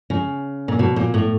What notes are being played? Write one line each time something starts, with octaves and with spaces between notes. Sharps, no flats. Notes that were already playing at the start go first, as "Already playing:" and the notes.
C#3
A#2
B2
A#2
A2